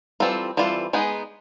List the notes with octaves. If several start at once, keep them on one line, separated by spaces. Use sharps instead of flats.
E3 G3 C4 F4 A4
E3 G3 C4 F4 A4
G#3 B3 D#4 G#4